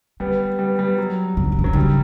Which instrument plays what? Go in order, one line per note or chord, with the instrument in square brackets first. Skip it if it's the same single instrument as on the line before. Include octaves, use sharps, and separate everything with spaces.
[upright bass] D3 [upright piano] G3 B3
[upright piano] G3 B3
G3 B3
F#3
[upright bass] C#3
D3
C#3
D3
[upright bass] C#3 [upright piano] F#3
[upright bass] D3 [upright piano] G3
[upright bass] C#3